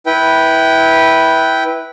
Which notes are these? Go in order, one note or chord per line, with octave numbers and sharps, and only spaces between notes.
E4 B4 G5